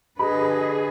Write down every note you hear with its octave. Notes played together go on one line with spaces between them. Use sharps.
D3 G4 G#4 B4 D#5 B5